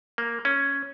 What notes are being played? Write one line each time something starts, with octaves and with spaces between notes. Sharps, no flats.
A#3
C#4